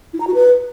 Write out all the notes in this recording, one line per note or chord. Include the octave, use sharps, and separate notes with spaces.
E4
A#5
F#4
B4